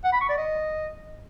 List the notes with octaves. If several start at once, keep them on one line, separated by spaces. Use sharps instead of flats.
F#5
B5
C#6
D5
D#5